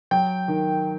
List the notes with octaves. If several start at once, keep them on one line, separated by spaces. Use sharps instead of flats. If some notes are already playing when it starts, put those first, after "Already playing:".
F#3 G5
D#3